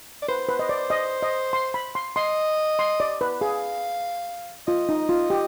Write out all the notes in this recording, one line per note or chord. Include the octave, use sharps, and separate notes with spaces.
D5
B4 C5
B4
D#5
D5
D#5
D#5
C6
B5
C6
D#5 C6
C6
D5
B4
G#4 F5
F4 D#5
D#4
F4
G4